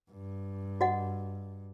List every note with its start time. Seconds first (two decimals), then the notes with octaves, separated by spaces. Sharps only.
0.12 G2
0.81 F#4 D#5 F#5